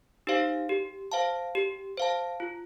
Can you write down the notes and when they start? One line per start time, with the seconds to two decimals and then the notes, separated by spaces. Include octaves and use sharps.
0.27 D#4 G4 C5 F5
0.69 G4
1.12 C5 F5 A5
1.55 G4
1.97 C5 F5 A5
2.40 F4